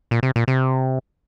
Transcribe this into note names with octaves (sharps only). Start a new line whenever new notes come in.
A#2
C3
A#2
C3